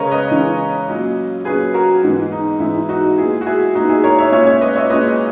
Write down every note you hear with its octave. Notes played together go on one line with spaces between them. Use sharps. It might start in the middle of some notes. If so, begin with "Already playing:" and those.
Already playing: C#3 G#3 C#4 A#4 B4 C#5 D#5
B4 D#5
C#3 E3 G#3 C#4
A#2 F#3 C#4
A#2 F#3 C#4 G#4 B4
F#4 A#4
G#2 E3 G#3 B3
D#4
G#2 E3 G#3 B3 E4
D#4 F#4
A#2 G#3 B3 E4 G#4
F#4
E4 G#4
A#2 G#3 B3 D#4 F#4
E4 G#4
A#4 C#5
C#5 E5
A#2 G#3 C#4 C#5 E5
C#5 E5
B4 D#5
C#5 E5
A#2 G#3 C#4 B4 D#5